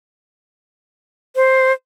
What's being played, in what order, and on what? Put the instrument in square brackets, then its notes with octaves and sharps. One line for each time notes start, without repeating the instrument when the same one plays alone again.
[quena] C5